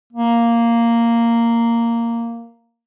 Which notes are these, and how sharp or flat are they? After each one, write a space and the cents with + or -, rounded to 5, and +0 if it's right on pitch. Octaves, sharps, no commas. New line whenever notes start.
A#3 -5